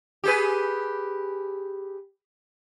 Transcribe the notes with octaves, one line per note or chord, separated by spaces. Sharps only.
G4 G#4 B4